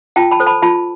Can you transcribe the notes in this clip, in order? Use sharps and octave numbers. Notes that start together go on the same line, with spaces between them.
F4 G5 A5
A5 B5
A4 C5
A5 B5
F4 A5 B5